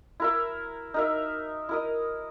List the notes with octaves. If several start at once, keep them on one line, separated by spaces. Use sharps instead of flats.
E4 A#4 E5
D#4 A#4 E5
E4 A#4 D#5